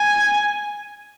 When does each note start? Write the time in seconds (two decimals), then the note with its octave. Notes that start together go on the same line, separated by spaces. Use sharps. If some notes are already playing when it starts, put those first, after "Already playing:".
Already playing: G#5